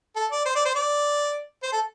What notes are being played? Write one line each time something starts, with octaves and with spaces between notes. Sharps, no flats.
A4
D5
C5
D5
C5
D5
C5
A4